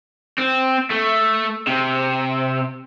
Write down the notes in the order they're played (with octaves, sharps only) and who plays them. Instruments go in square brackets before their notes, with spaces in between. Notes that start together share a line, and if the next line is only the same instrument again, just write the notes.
[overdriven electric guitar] C4
A3
C3